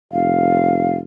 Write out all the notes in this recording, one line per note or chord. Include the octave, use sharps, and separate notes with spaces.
F1 F5